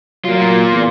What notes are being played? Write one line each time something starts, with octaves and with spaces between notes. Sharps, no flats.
F#3 A#3 F4
A#2
E2